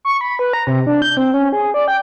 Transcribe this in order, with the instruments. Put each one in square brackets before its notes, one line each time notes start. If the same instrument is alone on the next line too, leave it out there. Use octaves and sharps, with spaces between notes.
[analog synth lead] C#6
B5
B4
A#5
C3
D4
G6
C4
C#4
G#4
D5
G5